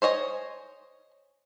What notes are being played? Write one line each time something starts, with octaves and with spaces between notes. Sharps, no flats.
C5 C#5 D#5 G#5